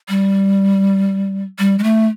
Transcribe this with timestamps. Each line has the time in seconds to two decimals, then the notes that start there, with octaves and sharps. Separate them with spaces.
0.09 G3
1.59 G3
1.78 G#3
1.83 A3